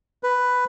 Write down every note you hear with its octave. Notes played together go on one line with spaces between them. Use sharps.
B4